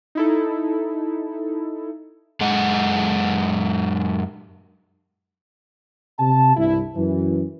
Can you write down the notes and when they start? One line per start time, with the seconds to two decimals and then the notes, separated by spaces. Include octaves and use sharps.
0.15 D#4 E4 A4
2.40 F#2 G#3 G#4 D#5 F#5
6.19 C3 A5
6.56 C2 G2 E4
6.96 F#2 E3